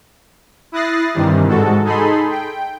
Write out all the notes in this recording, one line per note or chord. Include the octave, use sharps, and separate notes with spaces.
E4 D#6 F#6 A6 A#6 C7
G2 C3 D#3 E3 G3
G#2 G#3 F#4 A4
D#4 G#4 A4 B5 C6
G5